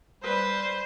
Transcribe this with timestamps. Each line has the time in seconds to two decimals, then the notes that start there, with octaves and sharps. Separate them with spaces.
0.23 G3 B4 C5